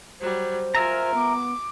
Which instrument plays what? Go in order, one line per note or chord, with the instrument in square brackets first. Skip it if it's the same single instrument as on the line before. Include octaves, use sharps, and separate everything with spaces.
[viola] F#3 G3 [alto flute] C5
[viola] F4 G#5 [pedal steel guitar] A#4 E5 A#5
[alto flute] B3 [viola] D6